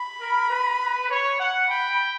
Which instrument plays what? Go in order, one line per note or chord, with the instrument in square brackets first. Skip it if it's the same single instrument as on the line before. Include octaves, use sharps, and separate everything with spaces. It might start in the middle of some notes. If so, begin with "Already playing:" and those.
Already playing: [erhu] B5
[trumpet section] A#4
B4
C#5
F#5
[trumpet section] G5 [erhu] B5